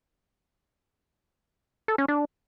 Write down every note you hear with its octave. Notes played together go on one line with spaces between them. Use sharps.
A4
C#4
D4